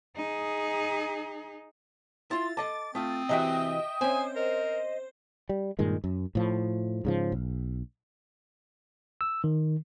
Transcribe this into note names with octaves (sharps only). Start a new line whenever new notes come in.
D#4 G#4
E4 F4 C6 A6
A4 D#5 A5 D6
A3 C4 F4 D#6
C3 E3 F#4 D#5 E5 G5
C4 C#4 C5 G#5
A#4 D#5
G3
G2 A#2 D#3 G#3
F#2
A2 F3
G#2 C#3 F3
B1
E6
D#3